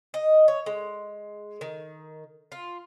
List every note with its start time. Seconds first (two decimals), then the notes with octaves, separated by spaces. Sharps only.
0.14 D#5
0.48 C#5
0.66 G#3
1.61 D#3
2.52 F4